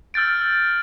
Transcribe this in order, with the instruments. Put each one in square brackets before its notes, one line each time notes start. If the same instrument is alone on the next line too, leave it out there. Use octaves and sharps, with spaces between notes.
[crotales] E6 F6 G6 A6 D7